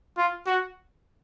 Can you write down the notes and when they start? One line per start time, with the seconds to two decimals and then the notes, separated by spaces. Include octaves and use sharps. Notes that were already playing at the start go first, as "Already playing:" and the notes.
0.17 F4
0.46 F#4